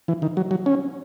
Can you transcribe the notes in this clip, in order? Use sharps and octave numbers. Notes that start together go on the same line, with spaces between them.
E3
D#3
F#3
F#3
C#4